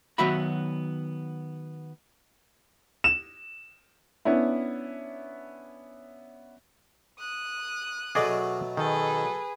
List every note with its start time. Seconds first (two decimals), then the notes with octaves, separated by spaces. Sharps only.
0.18 D#3 F#3 B3 F#4 E5 B5
3.04 E7
4.25 B3 C#4 D4 E4
7.19 D#6 F#6
8.15 B2 F#3 A3 G#4 D5 D#5
8.77 D#3 G#4 A4 B4